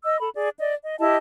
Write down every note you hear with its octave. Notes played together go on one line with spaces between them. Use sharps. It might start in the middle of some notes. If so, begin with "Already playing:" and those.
D#5 E6
A4 B5
G#4 D5
D5 D#5
D#5
E4 G4 D#5 A5